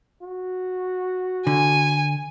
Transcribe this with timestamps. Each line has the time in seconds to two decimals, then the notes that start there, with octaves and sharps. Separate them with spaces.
0.22 F#4
1.47 D3 G#5